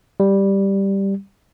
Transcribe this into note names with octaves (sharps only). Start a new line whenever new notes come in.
G3